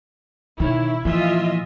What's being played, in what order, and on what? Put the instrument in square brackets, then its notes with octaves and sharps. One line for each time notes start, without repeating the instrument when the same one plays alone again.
[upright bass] B2 D3 [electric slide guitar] D#3 D#4 C#5 [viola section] E4
[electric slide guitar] A#2 E3 [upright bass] F3 [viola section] F4 D#5 E5